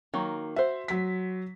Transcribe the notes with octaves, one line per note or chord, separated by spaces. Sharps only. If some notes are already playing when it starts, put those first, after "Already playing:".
D#3 F#3 A#3
F#4 C5 E5
F#3 B6